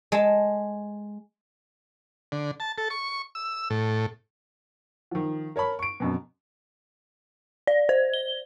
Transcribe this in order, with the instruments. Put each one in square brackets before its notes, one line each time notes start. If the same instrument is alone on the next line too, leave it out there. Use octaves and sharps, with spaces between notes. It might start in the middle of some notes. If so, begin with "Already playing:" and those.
[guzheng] G#3 A5
[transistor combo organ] D3
A5
A4
C#6
E6
A2
[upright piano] D#3 F3
A#4 C#5 A5 B5
C#6 D7
F1 F#2 B2
[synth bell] D5
C5
G7